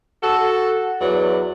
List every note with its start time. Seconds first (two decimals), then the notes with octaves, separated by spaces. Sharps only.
0.23 F#4 A4
1.01 E2 F#3 D5